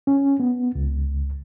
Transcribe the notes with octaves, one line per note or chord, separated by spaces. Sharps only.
C#4
B3
C#2